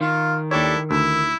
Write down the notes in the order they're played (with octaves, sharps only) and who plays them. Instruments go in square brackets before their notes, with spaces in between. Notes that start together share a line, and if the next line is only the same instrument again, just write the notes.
[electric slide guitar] D#3 [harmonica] F4
[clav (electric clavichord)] D#2 C#5 [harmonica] D4 G4 A4 [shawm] E4
[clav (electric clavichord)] D2 [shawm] E4 [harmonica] E6